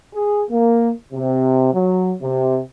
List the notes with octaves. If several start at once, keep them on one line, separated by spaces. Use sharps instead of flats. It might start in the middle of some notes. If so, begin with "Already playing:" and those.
G#4
A#3
C3
F#3
C3